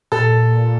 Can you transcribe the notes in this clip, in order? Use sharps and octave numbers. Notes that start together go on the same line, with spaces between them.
A#2 A4